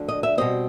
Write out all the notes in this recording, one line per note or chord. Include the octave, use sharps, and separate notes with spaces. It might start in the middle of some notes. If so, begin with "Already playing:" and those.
Already playing: D2 D3 F3
D#5
E5
B2 G3 C4 D#5